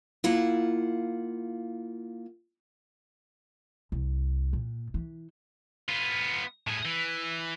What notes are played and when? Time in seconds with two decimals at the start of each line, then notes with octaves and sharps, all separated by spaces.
0.24 A#3 E4 F4 F#5
3.92 C2
4.53 A#2
4.94 E3
5.89 B3 F4
6.67 A2 G#4
6.85 E3